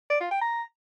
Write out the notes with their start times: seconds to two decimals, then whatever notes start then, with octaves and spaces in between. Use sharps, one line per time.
0.10 D5
0.21 F4
0.31 G5
0.42 A#5